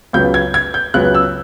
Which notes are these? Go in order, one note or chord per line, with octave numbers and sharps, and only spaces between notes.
C#2 C#3 F#3 B3 G6
G#6
G#6
G6
C#2 C#3 F#3 B3 F#6
E6